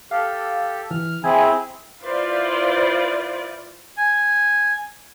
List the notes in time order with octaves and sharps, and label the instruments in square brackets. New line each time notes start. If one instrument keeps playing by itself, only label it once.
[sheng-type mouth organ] G4 A4 [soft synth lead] F5
[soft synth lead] E3 [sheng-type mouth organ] F6
[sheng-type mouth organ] C4 E4 G#4 [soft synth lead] G#5
[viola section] E4 F4 B4 C5 D5
[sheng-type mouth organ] G#5